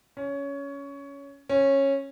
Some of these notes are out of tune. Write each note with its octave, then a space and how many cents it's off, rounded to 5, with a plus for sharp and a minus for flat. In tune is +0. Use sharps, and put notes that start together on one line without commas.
C#4 +15
C#4 -15